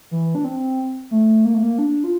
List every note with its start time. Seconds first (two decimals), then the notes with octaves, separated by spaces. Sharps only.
0.11 E3
0.35 D4
0.44 C4
1.11 A3
1.45 A#3
1.54 A3
1.63 A#3
1.78 D4
2.04 F4